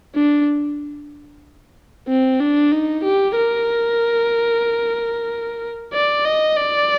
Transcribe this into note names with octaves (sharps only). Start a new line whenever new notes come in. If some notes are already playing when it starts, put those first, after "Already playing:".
D4
C4
D4
D#4
G4
A#4
D5
D#5
D5